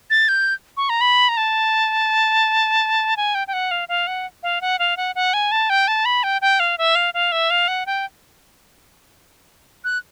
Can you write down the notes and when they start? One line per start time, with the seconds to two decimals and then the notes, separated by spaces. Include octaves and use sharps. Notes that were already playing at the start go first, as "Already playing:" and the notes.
0.10 A6
0.29 G6
0.77 C#6
0.89 A#5
1.01 B5
1.29 A#5
1.37 A5
3.17 G#5
3.35 G5
3.48 G5
3.53 F#5
3.71 F5
3.89 F5
4.07 F#5
4.43 F5
4.61 F#5
4.79 F5
4.97 F#5
5.15 F#5
5.34 G#5
5.52 A5
5.70 G5
5.88 A5
6.05 B5
6.23 G5
6.42 G5
6.60 F5
6.78 E5
6.95 F5
7.14 F5
7.32 E5
7.50 F5
7.68 F#5
7.86 G5
9.84 F#6